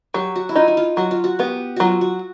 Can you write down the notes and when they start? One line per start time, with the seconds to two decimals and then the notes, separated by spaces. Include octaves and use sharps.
0.14 F#3 G4
0.36 F#4
0.49 E4
0.56 D#4 F4
0.68 E4
0.77 F4
0.97 F#3 F#4
1.11 F4
1.24 F#4
1.39 B3 G4
1.76 F#3 F4 F#4
2.01 F#4